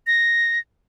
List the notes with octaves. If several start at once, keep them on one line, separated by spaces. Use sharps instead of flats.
A#6